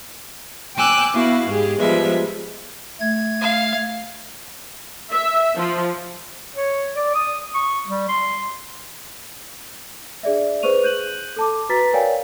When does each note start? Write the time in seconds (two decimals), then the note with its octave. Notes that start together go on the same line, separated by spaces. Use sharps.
0.76 G5 G#5 D6 E6 F#6 G6
1.13 B3 E4 F#4 F5
1.47 G#2 G4 G#4
1.80 F3 G3 G#3 B3 E5
3.00 A3 G#6
3.41 F5
5.12 E5
5.56 F3
6.56 C#5
6.96 D5
7.15 D#6
7.54 C#6
7.88 G3
8.09 C6
10.23 D4 G#4 D5 E5
10.62 G#4 B4 C5 C#6 D#7 F7
10.83 F#6 G6 D#7 F#7
11.36 A4 A5 D6
11.69 F#4 B4 A#5 A6 B6
11.93 A#4 C#5 D5 F5 G5 G#5